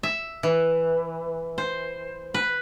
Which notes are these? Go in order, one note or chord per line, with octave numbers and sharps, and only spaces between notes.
E5
E3
C5
B4